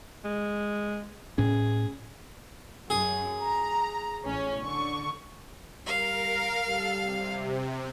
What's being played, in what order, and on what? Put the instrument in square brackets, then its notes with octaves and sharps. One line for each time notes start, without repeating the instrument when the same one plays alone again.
[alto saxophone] G#3
[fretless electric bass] A2 C#4 [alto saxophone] G#4
[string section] F#2 [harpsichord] G#4
[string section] A#5
A1 C#4
D3 C#6
[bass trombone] G3 [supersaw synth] A#4 [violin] F5
[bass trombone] G3 [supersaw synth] A4
[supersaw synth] C3